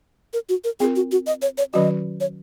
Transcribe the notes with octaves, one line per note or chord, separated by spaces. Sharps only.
A#4
F#4
A#4
C4 F4 G#4 A#4
F#4
F#4
D#5
C#5
C#5
D#3 F#3 C#4 F#4 D#5
C#5